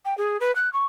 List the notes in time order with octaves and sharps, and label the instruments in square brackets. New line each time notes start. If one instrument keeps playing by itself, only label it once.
[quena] G5
G#4
B4
F#6
C#6